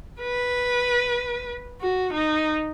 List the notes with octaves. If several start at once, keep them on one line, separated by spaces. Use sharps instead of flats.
B4
F#4
D#4